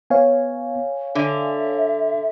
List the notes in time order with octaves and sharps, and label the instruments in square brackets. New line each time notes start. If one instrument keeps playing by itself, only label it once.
[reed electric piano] B3 [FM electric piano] C#5 F5 G#5
[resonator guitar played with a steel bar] D3 [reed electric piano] D4 [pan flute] E5